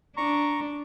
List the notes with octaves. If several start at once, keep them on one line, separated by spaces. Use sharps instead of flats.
D4 A#5 C#6